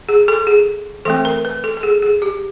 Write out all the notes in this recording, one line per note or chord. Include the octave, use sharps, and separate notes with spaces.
G#4
A4
G#4
E3 A3 C4 A4
A#4
B4
A4
A4
G#4
G#4
G4